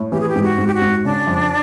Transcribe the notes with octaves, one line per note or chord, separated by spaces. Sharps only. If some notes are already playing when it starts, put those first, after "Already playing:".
Already playing: A2
E3 G4
G#4
G4
G#2
F#4
G#2
G4
F#4
G#2
C#3 D4
F2